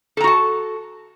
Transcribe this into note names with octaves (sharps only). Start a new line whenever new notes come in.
F#4 A4 A5 A#5